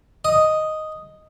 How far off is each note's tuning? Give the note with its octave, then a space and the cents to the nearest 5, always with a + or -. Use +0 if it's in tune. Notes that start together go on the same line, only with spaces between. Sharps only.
D#5 +0 D#6 +0